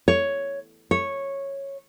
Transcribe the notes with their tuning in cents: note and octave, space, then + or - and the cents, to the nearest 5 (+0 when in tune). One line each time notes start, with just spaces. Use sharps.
C#5 +5
C#5 -10